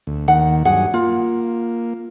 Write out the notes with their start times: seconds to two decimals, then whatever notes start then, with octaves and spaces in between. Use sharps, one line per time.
0.07 D2
0.28 D#2 D#3 F#5
0.65 G2 F#3 G#4 F#5
0.94 A#3 F4